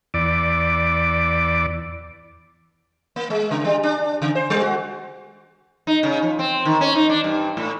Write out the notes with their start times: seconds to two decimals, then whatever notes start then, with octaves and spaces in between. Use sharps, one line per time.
0.14 E2 D5
3.16 A#3
3.30 G#3
3.51 C#3
3.64 G3
3.83 D4
4.22 C#3
4.35 C5
4.50 G3
4.62 F#4
5.87 D#4
6.03 C#3
6.23 F3
6.39 C4
6.65 D#3
6.81 C#4
6.95 D#4
7.09 D4
7.24 G2
7.57 A2